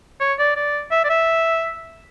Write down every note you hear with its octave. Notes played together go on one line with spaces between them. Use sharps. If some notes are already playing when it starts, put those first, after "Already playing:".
C#5
D5
D5
E5
D5
E5